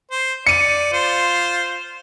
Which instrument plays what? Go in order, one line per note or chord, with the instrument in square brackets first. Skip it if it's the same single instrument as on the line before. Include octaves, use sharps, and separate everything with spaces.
[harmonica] C5
[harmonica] D5 [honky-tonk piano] C#7 D#7
[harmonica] F4 C5